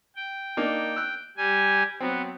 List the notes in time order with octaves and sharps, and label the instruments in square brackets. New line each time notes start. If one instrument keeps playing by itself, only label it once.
[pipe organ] G5
[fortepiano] A#3 D4 D#4
E6 F#6
[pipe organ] G3 G#5
[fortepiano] F#3 C4 [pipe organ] B3